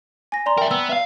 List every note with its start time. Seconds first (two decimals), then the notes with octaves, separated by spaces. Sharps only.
0.32 G#5 A#6
0.46 D5 A#5 C6
0.58 A#4 E5 G5
0.71 B3 E6
0.89 E5 F5